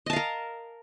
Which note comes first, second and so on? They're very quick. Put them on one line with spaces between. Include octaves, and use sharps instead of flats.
D#5 A5 F5 A#4